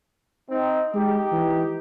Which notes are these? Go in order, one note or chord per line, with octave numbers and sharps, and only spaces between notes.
C4 D#4
G#3 D#4 G4
E3